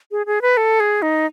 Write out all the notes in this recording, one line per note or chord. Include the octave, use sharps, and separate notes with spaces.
G#4
G#4
B4
A4
G#4
D#4